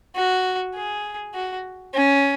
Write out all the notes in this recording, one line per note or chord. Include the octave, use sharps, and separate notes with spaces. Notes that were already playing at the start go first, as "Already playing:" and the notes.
F#4
G#4
F#4
C#4